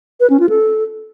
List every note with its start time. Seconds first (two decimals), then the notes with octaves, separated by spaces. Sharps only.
0.20 B4
0.30 C#4
0.40 F4
0.49 A4